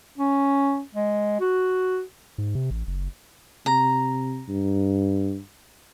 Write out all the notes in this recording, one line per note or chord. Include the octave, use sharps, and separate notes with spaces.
C#4
G#3
F#4
G#2
C3
A1
F#1
C3 A#5
G2